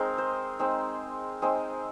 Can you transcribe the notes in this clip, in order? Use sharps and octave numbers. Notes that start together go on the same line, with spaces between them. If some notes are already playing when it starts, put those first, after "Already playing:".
Already playing: G#3 C4 D#4 G#4 A#4
C5
G#3 C4 D#4
G#3 C4 D#4 G#4